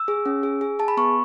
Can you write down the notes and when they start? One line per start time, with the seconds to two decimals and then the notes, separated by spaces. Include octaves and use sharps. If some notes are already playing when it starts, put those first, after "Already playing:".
Already playing: E6
0.08 G#4
0.26 C#4
0.43 G#4
0.61 G#4
0.79 G#4 A5
0.88 B5
0.97 B3 C#6